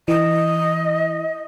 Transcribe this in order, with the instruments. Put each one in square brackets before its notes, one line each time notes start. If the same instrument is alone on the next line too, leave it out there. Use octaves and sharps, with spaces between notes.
[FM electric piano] E3 [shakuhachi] D#5